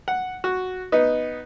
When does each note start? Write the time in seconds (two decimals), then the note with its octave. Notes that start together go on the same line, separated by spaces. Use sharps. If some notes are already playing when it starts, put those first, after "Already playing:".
0.08 F#5
0.44 F#4
0.92 B3 D#4